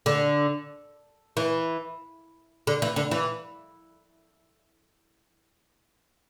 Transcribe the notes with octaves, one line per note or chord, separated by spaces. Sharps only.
D3
E3
D3
E3
D3
E3